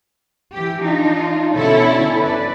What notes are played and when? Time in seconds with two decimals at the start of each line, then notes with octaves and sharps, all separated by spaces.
0.53 E3 G4
0.84 D4 D#4 F4
1.55 B2 D3 C#4 E4 A4 C#5
2.20 B4 D5